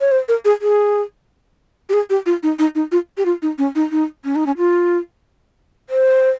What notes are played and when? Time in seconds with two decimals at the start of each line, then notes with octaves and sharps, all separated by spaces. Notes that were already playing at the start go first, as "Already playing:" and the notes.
0.01 C#5
0.11 C5
0.28 A#4
0.45 G#4
0.61 G#4
1.89 G4
1.93 G#4
2.10 G4
2.26 F4
2.43 D#4
2.59 D#4
2.75 D#4
2.92 F4
3.17 G4
3.25 F4
3.42 D#4
3.58 C#4
3.75 D#4
3.91 D#4
4.24 C#4
4.35 D#4
4.46 C#4
4.58 F4
5.90 C5